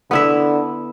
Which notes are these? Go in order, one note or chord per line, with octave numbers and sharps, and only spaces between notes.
D3 B3 E4 E5